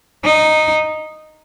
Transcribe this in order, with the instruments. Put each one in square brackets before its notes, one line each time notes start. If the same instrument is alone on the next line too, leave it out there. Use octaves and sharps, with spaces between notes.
[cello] D#4